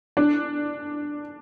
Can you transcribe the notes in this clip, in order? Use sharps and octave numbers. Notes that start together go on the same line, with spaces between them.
D4